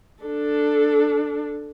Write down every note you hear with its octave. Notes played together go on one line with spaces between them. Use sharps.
D4 A4